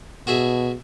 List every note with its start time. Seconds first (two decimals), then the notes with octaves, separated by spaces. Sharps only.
0.27 B2 F#4 G#4 E5